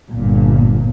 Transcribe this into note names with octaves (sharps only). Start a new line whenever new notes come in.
G1 A#2